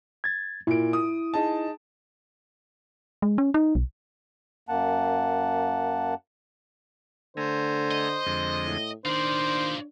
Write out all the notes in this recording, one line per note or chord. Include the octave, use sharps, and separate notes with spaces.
G#6 A6
A#2 E4 D7
D#6
D#4 G#4 A5
G#3
C#4
D#4
B1
F#2 A#3 F#5 A5
D3 A3 C5 G#5 A#5
D#5
F2 D3 G#3
A2
D#3 D4 F4 C5 D5